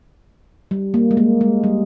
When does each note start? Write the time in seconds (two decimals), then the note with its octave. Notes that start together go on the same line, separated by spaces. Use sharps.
0.71 G3
0.94 A#3
1.11 G#3
1.17 A#3
1.41 G#3
1.64 G3